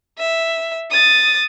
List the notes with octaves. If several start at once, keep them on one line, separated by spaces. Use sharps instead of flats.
E5
D#6 A6